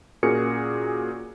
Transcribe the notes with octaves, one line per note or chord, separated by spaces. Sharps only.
A#2 C#4 F#4 G#4 A#4 C#7